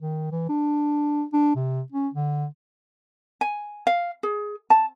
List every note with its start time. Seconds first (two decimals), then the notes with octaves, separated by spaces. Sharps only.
0.01 D#3
0.32 E3
0.49 D4
1.33 D4
1.55 C3
1.92 C#4
2.14 D3
3.41 G#5
3.87 F5
4.23 G#4
4.70 A5